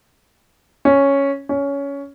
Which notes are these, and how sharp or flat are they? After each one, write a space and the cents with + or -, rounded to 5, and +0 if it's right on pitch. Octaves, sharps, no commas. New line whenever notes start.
C#4 +0
C#4 +15